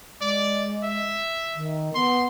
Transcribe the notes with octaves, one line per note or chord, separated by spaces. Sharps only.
G#3 D5
E5
D#3
B3 C6